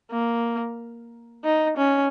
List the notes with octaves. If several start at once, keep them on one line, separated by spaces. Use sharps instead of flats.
A#3
D#4
C#4